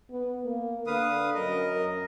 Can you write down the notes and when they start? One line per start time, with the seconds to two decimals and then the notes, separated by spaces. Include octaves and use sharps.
0.11 B3
0.44 A#3
0.87 D3 B4 F5 D#6
1.35 F#2 A#4 D#5